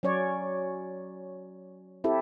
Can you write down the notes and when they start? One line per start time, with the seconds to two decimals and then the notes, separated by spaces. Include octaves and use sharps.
0.03 F#3 C#4 C#5 D5
2.04 C4 E4 G4 A4